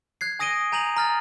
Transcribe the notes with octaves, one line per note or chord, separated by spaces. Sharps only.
F#6 G#6 C7
G#5 D#6 A#6 D7 D#7 G7
G#5 A#5 G6 D#7 F7 F#7
A#5 F6 A6